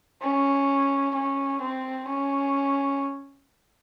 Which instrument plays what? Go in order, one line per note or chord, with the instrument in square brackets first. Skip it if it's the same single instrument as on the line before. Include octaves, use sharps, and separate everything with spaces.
[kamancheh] C#4
C#4
C4
C#4